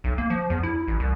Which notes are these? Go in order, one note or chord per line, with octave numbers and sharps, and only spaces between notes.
B1
A#3
F3
E2
E4
A1
C2